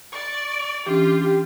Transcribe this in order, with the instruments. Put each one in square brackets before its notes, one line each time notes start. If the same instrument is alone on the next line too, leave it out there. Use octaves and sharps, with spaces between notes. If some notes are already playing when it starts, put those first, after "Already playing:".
[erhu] D5 [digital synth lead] C#6
[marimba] E3 C#4 D4 [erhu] F4 [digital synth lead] G4